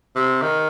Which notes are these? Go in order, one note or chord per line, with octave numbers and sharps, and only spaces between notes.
C3
D#3